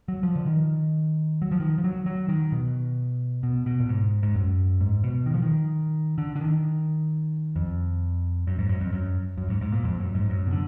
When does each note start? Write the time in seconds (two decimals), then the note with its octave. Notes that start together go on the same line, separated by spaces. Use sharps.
0.08 F#3
0.23 F3
0.36 D3
0.46 D#3
1.42 F#3
1.51 F3
1.60 D#3
1.78 F3
1.84 F#3
2.06 F#3
2.28 D#3
2.52 B2
3.43 B2
3.66 B2
3.80 A#2
3.89 G#2
4.23 G#2
4.35 F#2
4.81 G#2
5.04 B2
5.26 D#3
5.34 F3
5.42 D#3
6.18 D3
6.36 D3
6.41 D#3
7.56 F2
8.47 F#2
8.59 G#2
8.69 F#2
8.81 F2
8.92 F#2
9.37 F#2
9.50 G#2
9.61 G#2
9.72 A#2
9.84 F2
10.00 F#2
10.15 G#2
10.29 F#2
10.47 B2
10.52 D3